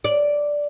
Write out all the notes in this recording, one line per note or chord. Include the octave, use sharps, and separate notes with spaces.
D5